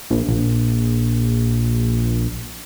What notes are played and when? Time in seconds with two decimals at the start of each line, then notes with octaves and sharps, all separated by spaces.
0.10 A#1
0.27 A#1